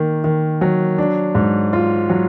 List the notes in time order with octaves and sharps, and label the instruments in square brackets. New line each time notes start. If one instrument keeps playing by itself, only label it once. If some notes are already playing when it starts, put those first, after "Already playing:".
Already playing: [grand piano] D#3 A#3
D#3
F#3
D4
G#2
F4
F#3